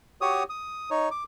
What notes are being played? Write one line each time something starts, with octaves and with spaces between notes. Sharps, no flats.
F#4 G4 C#5 D#6
D#6
D#4 C#5
D6